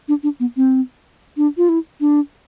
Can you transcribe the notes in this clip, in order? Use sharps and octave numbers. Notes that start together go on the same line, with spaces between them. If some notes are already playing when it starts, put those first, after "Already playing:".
D4
D4
B3
C4
D4
F4
E4
D4